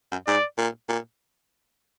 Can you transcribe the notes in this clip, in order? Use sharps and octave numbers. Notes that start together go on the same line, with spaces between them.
F#2
G#2 D5
A#2
A#2